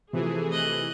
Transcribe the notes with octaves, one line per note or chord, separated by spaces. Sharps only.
C3 E3 F3 A3 G#4
D#5 F#6